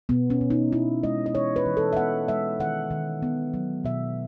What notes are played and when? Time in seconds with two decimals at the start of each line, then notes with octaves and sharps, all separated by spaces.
0.09 B2 B3
0.30 C#4
0.41 B2
0.50 D#4
0.72 B3 E4
1.03 G#3 D#5
1.26 D#5
1.35 E3 C#5
1.56 B4
1.66 E3
1.77 A4
1.93 E5
1.97 B3 F#5
2.28 G#3 E5
2.60 D#3 F#5
2.91 D#3
3.23 B3
3.54 F#3
3.84 B2 E5